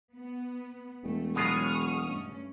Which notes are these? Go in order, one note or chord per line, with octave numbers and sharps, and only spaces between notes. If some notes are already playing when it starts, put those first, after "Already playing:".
B3
E1 A3
B2 F#3 G#3 F4 G#4 C#6 D#6 F6
G2 A3 C#4